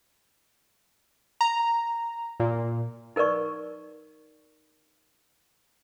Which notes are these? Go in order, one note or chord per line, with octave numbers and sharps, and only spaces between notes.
A#5
A#2
D#4 A#4 B4 D5 C#6